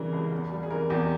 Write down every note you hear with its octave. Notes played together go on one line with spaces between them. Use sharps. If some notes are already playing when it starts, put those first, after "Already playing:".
Already playing: C#3 E3 G3 A#4
C#2
E2
G3
G#4
E3 A#4
E2 G4